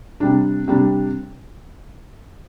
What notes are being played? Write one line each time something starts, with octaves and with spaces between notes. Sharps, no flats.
C3 G3 D4
C3 G3 D4